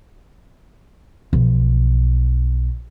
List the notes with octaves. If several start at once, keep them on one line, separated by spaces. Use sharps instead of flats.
B1 F3